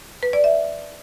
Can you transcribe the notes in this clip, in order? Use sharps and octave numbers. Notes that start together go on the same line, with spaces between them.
B4
D5
E5